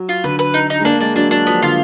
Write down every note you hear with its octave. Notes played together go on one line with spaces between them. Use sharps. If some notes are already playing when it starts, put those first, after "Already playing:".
Already playing: F#3
F4
D3 B4
B4
D#4
D#4
G#3
A#3 D4
G#3 D4
F#3 D4
F#3 D4
F3 B3
D3 F4